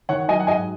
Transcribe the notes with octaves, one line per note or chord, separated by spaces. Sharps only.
D#3 C#5 F#5
F#3 D#5 G#5
F#5
G#2 D#5 G#5